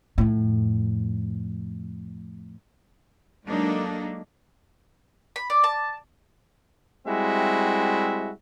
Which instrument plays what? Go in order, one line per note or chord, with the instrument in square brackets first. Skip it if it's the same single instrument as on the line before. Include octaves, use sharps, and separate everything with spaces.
[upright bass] F2 A2
[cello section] F#3 G#3 A#3 D4 D#4 A4
[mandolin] B5
D5
A5
[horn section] G3 G#3 C4 E4 F#4 E5